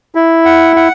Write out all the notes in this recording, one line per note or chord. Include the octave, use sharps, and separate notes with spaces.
E4
F#5
F#5